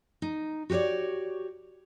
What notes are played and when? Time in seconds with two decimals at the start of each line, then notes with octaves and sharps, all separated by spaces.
0.22 D#4
0.70 F#4 G4 B4 C#5 D5